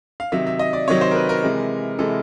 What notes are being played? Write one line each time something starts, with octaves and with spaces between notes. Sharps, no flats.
F5
C3 D#3 F#3 E5
E5
D#5
D5
C3 D#3 F#3 C#5
C5
A#4
B4
A#4
C3 E3 G#3
C3 E3 G#3 A4